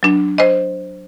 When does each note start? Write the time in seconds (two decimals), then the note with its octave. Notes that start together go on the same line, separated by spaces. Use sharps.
0.03 F#3 D4
0.38 C5 D#5